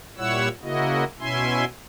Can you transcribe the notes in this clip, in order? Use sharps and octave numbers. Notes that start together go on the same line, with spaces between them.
A#2 G3 E4 C#5 F#5 E6
C#3 A#3 E4 F#4 D#5
B2 C#4 E4 E5 G#5 C6